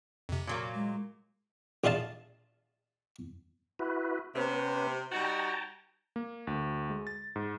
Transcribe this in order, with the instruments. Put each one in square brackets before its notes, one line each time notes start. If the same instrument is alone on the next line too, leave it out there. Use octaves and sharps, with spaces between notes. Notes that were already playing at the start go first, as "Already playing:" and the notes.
[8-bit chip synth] F2 C3
[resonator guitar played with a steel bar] A#2 F#3 A#3
[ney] G#3
[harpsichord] A#1 F4 G#4 D#5 F5 A5
[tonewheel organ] E4 F#4 B4
[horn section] C3 [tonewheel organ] B3 C#4 B4
[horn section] G3 D#4 F#4 [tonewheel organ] G5 A5 A#5
[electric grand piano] A#3
D2
G#3
A6
G#2